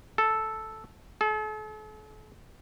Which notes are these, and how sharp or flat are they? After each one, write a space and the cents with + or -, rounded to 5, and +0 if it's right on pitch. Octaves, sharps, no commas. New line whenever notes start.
A4 -5
A4 -45